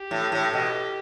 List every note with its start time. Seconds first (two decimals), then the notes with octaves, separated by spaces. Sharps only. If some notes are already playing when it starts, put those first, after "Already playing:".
Already playing: G4
0.11 A2
0.32 A2
0.53 B2